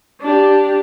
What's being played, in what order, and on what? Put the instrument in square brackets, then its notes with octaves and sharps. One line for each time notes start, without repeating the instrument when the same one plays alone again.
[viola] D4 G4